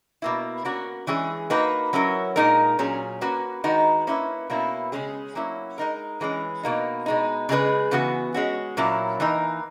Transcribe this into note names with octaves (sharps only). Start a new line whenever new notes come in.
B2 A#3 E4
A#3 C#4 F#4 A#4
E3 G#3 C#4 G#4
A#3 D#4 F#4 B4
F#3 C#4 E4 A#4
A#2 G#3 D#4 A#4
A#2 F#3 C#4 G#4
A#3 C#4 F#4 B4
D#3 G#3 D#4 F#4 B4
A#3 C#4 E4 B4
B2 A#3 C#4 E4
C#3 G#3 C#4 G#4
F#3 A#3 C#4 E4
G#3 D#4 A#4
E3 G#3 C#4
B2 A#3 D#4
B2 G#3 D#4
C#3 G#3 D#4 G#4 B4
C#3 E3 B3 F#4
G#3 C#4 F#4
A#2 F#3 A#3 C#4 E4
E3 A#3 D#4 A#4